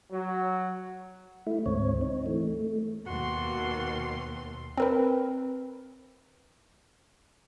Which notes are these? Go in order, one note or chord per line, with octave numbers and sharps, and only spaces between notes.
F#3
A3 E4
D2 G#2 C4 C#5
C4 D#4
E3 A3
A3
D#2 B2 F#4 C6
C4 A#4 B4